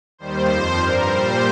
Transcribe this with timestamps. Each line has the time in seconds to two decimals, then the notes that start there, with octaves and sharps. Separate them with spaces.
0.18 D#2 D#3 G3 C5
0.48 F2 F3
0.77 G2 G3 A#4
1.06 A#2 G3 C5